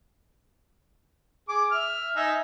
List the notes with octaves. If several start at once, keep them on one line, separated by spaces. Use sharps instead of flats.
G#4 D6
E5 F6
D#4 E5 G#5